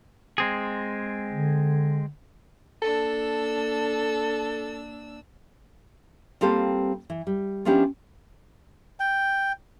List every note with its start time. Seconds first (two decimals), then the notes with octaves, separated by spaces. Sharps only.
0.38 G#3 C4 G#4
1.33 D3
2.82 A#3 D4 A4 E6
6.41 G3 A#3 C4 F4 G4 A4
7.10 E3
7.27 G3
7.65 F3 B3 C#4 D4 E4 G4
9.00 G5